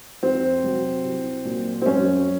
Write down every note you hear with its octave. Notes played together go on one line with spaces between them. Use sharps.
F2 C4
C3 F#3
C2
A#2 F#3
C4
F#2 C#4